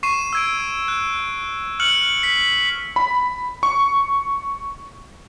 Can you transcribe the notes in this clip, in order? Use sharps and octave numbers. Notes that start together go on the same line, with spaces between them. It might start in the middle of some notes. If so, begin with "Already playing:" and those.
C#6 C7 D#7 E7
E6 G#6 D7
F#6
F6 F#6 C#7 F#7
B6
B5
C#6